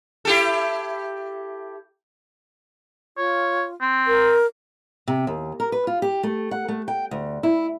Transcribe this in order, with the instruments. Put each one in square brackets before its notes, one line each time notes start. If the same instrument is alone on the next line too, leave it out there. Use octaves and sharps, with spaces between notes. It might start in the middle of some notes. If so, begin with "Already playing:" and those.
[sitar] E4 G4 A4
[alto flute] F4 [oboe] C#5
[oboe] C4
[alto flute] A#4
[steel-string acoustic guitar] C3
D#2
A#4
B4
F4
G4
A3
F#5
A3
G5
D2
E4